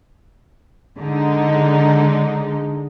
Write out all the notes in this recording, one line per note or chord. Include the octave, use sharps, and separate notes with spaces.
D3 G#3 D#4